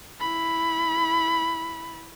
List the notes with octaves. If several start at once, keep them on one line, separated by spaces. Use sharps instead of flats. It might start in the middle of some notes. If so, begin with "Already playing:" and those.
E4 B5